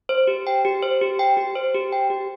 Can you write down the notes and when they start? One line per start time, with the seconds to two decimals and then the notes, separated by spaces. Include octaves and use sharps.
0.09 C5
0.27 G4
0.47 G5
0.65 G4
0.83 C5
1.01 G4
1.19 G5
1.37 G4
1.55 C5
1.75 G4
1.92 G5
2.10 G4